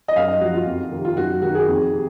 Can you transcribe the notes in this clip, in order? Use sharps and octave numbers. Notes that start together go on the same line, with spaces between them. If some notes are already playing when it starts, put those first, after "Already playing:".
D#5
F#2 F5
D#5
F3 F#4
F4
F2
C3 D#3
F4
F#2 F#4
D#3 F#4
G#4
F2
C3